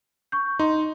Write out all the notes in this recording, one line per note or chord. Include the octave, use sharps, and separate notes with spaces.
C#6 G6
D#4 C6